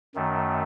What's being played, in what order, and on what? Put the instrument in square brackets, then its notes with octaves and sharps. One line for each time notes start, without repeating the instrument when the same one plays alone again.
[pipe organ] F#2 D#3 A3